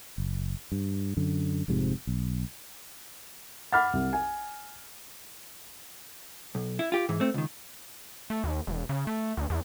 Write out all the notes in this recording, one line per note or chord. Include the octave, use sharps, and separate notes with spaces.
F#1
G2
F#2 D3
F1 F2 G#2 C3
B1
F#5 B5 D6 F6 A6
C2
G#5
B1
E4
F4 G4
G#2 E3
A3 C4
C#2 D#3
A3
D#2
E1
C#3
A3
D2
E2